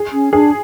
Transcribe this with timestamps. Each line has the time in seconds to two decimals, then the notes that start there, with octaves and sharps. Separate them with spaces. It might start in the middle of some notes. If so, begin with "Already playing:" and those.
Already playing: G#4
0.13 C#4
0.33 D4 G#4